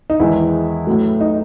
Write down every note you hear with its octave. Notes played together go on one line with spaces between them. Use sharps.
D#4
E2 D#3 G#3 E4
A2 F#3 A3
D#4